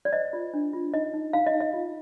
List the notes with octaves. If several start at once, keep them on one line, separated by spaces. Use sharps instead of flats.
D5
C5 D#5
F4
D4
F4
D#4 D#5
D#4
D#4 F5
D#5
D#4
D#5
F4